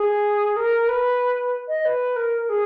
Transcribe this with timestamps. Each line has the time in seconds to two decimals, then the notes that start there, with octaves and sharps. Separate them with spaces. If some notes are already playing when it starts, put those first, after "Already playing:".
Already playing: G#4
0.56 A#4
0.88 B4
1.68 D#5
1.85 B4
2.16 A#4
2.49 G#4